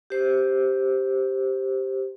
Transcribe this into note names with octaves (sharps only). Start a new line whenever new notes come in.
G4 C5